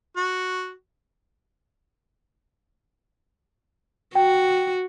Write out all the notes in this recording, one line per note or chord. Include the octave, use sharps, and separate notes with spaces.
F#4
F#4 G5